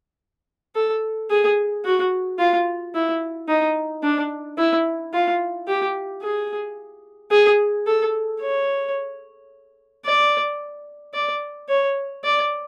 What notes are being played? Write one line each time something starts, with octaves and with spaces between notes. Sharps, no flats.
A4
G#4
F#4
F4
E4
D#4
D4
E4
F4
G4
G#4
G#4
A4
C#5
D5
D5
C#5
D5